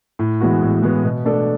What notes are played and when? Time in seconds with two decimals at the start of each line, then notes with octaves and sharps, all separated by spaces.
0.19 A2
0.40 E3 G#3 B3 F#4
0.62 A2
0.83 E3 G#3 B3 F#4
1.04 B2
1.25 A3 D4 A4